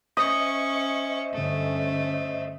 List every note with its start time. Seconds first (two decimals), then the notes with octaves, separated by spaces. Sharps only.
0.17 C#4 C5 D#5 E5 C#6 D#6
1.33 G2 D3 A3 C#4